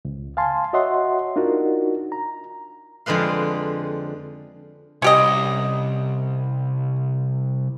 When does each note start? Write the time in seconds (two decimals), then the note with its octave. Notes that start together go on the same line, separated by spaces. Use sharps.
0.05 C#2
0.37 F5 G#5 A5 C6
0.73 F#4 C#5 D#5 E5 F#5 C6
1.36 D4 D#4 F4 F#4 A#4
2.12 A#5
3.06 F2 D3 G#3 B4 F5
5.02 C2 C#4 G4 D#5